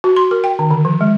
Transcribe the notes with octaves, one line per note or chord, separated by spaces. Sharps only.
F#4
C6
A#4
G5
D#3
D3
F3
G#3